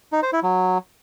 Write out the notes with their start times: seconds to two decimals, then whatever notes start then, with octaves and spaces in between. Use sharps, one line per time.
0.13 D#4
0.23 C5
0.33 E4
0.43 F#3